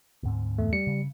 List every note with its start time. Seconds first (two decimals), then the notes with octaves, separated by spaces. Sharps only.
0.23 D2 G#2 C4
0.58 E2 A3
0.73 G3 C#7
0.87 C#3